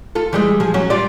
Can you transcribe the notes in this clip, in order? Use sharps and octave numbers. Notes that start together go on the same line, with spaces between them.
F4 A4
E3 G3 G#3
F3 G#4
F#3 C#4
G3 F4 D5